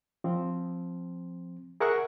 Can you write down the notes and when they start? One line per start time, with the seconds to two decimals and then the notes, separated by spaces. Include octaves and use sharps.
0.24 F3 C4
1.80 G#4 A#4 E5 F#5 C#6 F#6